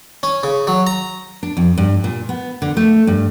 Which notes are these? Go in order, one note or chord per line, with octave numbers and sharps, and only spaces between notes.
C#4
C#3
F#3
A#5
D4
F2
G2
A#2
B3
D3
A3
G2